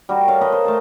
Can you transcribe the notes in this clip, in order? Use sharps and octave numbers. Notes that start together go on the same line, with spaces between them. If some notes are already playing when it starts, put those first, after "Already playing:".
G3 F#4 A#4
A4 C#5 D#5 F5
A#4 B4 D#5
C5
A3 A5